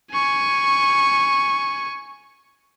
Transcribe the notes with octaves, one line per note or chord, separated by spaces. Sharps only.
G#5 C#6